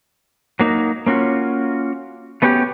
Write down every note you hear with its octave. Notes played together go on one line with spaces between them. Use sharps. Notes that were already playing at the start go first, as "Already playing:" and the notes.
F#3 A#3 D#4
A#3 C#4 F4 F#4
A3 B3 C#4 F#4 G4